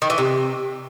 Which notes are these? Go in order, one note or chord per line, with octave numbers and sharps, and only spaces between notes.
D#3
E3
C3